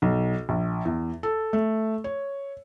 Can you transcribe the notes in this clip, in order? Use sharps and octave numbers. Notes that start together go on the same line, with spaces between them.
B1
A#1
E2
A4
A3
C#5